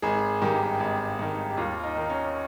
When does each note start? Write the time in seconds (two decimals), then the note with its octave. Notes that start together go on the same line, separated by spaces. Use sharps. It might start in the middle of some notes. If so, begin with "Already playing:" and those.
0.02 G#1 G#4
0.42 G2 D#3 G4
0.80 G#1
1.19 G2 D#3
1.50 G4
1.57 D#2 F4
1.83 D#4
1.96 D#3
2.10 C#4